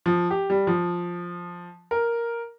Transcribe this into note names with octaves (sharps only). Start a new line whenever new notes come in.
F3
G4
G3
F3
A#4